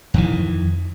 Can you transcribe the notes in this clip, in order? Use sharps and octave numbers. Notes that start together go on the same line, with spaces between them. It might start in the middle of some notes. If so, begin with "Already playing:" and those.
F2 D#3 E3